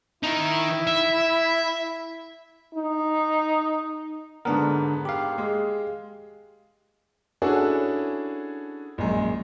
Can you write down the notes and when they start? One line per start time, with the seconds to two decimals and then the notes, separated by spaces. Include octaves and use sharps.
0.23 D#3 D#4 E4
0.87 E5
2.75 D#4
4.45 G#2 D3 B3 D4 A#4
5.05 G4 F5
5.38 G#3
7.42 C#4 D4 E4 F#4 G#4 A4
8.98 A#1 F#2 G#3